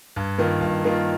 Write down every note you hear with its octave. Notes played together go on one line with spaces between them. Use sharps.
G2
D#3 A#3 F4 A#4
G2
D#3 A#3 F4 A#4